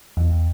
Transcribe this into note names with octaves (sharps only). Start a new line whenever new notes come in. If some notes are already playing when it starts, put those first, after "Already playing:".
E2